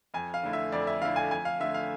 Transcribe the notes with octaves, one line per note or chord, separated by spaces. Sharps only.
F2 G#5
F5
D3 A3 E4
E5
F2 D5
E5
D3 A3 E4 F5
G#5
F2 G#5
F5
D3 A3 E5
F5